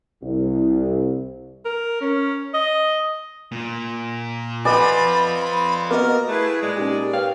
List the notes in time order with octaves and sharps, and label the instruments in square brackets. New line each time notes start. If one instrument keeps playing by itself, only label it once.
[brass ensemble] C2
[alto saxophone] A#4
C#4
D#5
[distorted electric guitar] A#2
[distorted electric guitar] C4 F4 [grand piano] B4 F#5 G#5 [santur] D5 D#5 [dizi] B5
[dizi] B5
[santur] A#3 [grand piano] B3 F#4 D#5 [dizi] A#4
[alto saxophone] A3 [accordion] E4 G#4 B4
[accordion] A#2 D5 [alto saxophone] G#3
[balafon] C#4 D#4 [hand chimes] G4 A#4
[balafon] B4 C#5 G5 [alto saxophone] F5